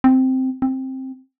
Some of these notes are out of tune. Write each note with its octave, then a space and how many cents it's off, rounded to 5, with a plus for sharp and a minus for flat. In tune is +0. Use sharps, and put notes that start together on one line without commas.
C4 -5
C4 +10